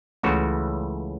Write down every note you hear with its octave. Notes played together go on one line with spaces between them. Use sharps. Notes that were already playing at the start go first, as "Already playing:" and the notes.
C#2 C#3 E3 A3 F#4